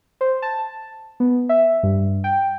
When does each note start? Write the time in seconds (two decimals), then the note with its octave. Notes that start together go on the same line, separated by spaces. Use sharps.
0.21 C5
0.42 A5
1.20 B3
1.49 E5
1.83 G2
2.24 G5